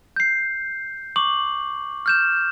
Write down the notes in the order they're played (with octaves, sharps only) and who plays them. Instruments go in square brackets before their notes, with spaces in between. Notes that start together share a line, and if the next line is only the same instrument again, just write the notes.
[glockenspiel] G6 C7
C#6 D6 F#7
F6 G6 E7